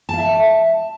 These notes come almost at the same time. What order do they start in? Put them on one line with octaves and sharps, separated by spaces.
A5 F5 E5